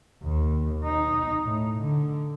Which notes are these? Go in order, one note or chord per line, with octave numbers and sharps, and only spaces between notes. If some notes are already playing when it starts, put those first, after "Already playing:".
D#2
D#4
A2
D3